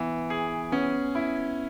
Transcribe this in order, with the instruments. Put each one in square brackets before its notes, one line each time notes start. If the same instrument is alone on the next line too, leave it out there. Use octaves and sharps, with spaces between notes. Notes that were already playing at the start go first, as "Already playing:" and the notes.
Already playing: [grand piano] E3 [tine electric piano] B3
[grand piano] G#4
[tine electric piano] B3 [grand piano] C#4
[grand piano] E4